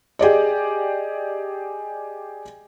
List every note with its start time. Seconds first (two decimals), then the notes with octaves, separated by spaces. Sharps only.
0.19 G4 G#4 D5 D#5